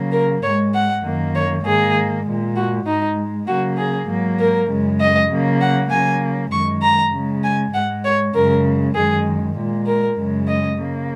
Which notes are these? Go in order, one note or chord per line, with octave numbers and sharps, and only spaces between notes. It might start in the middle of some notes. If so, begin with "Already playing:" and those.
Already playing: C#3 F#3 A#3
A#4
G#2 G#3 C#5
F#5
F#2 D#3 A#3
C#5
G#2 D#3 A#3 G#4
A#2 G#3
F#4
G#2 G#3 D#4
C#3 F#3 A#3 F#4
G#4
G#2 F#3 A#3
A#4
F#2 C#3 G#3
D#5
C#3 F#3 A#3
F#5
C#3 F#3 A#3 G#5
F#2 D#3 G#3 C#6
A#5
C#3 G#3
G#5
G#2 G#3 F#5
C#5
F#2 C#3 G#3 A#4
F#2 D#3 G#3 G#4
A#2 G#3
A#4
F#2 C#3 G#3
D#5
C#3 A#3